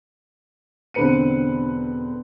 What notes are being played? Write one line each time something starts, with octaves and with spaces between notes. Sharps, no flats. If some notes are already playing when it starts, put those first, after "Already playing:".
E1 D3 C4 B4 C#7 D#7